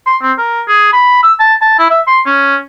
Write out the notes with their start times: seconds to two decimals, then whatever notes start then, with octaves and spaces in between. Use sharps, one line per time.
0.06 C6
0.22 C4
0.38 A#4
0.68 G#4
0.93 B5
1.23 E6
1.40 A5
1.61 A5
1.79 E4
1.90 E5
2.07 C6
2.26 C#4